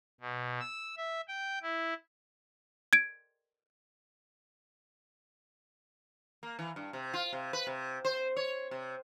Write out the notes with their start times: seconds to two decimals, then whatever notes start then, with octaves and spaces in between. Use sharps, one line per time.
0.21 B2
0.60 E6
0.97 E5
1.28 G5
1.62 E4
2.93 G#6 D7
6.43 A#3
6.59 E3
6.76 G2
6.93 C3
7.14 F4
7.33 C3
7.53 B4
7.67 C3
8.05 C5
8.37 C#5
8.71 C3